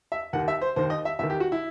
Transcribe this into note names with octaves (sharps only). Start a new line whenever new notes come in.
E5
D#2 D#3 F#5
E5
C5
D#2 D#3 C5
D#5
E5
E2 D#3 E5
G4
F#4
E4